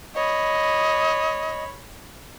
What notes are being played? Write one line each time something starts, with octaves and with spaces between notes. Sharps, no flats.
C#5 D#5 B5